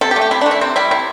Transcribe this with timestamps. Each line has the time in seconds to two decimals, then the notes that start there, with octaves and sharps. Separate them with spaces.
0.01 C3 A4
0.11 G4
0.16 A3
0.21 G4
0.31 C3 E4
0.41 D4
0.46 A3
0.51 E4
0.61 C3 C4
0.76 G3 E4
0.91 C3